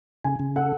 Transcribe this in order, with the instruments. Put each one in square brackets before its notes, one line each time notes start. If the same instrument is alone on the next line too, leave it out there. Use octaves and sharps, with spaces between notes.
[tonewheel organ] C#3 [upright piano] G#5
[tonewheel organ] C#3
[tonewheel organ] A4 [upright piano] F#5